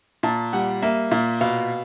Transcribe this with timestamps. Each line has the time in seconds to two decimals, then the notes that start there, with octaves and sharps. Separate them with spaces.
0.23 A#2 A5
0.53 G3 F#5
0.82 A#3 E5
1.11 A#2
1.41 B2 F5